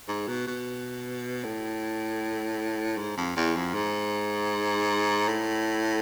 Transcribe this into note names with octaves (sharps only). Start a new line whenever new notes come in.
G#2
B2
B2
A2
G#2
F2
E2
F2
G#2
A2